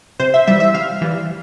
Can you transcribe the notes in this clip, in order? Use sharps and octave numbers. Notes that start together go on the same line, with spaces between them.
C3 C5
E5
E3 G3 E5
E5
C3 F5
E3 G3